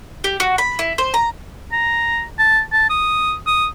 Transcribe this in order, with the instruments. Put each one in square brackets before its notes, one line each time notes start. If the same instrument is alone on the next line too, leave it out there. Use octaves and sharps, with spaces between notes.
[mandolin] G4
F#4
B5
E4
C5
A#5
[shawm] A#5
A5
A5
D#6
D#6